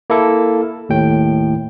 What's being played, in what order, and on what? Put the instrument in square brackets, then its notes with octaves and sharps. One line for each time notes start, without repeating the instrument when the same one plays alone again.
[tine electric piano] A#3 E4 A4
D#2 A2 G5